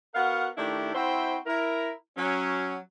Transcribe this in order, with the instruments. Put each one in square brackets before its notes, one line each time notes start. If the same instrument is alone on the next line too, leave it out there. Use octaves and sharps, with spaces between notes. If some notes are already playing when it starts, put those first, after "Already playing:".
[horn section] B3 F#4 A#4 F5 F#5
D#3 A3 D4 E4 G4
C4 E4 F#4 C5 E5 G5
E4 A#4
F#3 C#4